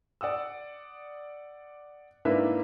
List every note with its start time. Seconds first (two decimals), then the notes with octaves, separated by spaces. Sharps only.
0.21 D5 F#5 D#6 E6
2.25 G#2 A#3 D4 E4 B4 E5